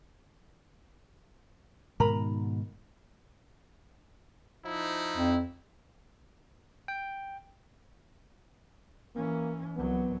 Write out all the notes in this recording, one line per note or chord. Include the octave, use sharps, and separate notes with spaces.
G#2 B2 D#3 A#4 A#5 B5
F3 D#4 E4
F2
G5
E3 A#3 C#4
C2 F#3 B3